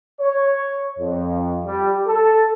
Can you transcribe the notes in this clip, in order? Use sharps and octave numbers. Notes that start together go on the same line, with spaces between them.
C#5
F2
G3
A4